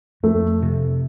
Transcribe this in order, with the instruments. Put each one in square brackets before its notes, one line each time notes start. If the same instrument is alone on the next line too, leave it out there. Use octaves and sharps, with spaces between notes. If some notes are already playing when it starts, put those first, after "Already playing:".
[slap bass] F2 [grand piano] A3
[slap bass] C3